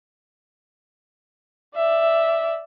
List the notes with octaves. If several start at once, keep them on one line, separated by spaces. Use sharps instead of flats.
D5 E5